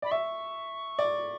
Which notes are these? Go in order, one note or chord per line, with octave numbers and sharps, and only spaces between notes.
D5 B5
E5 C#6
D5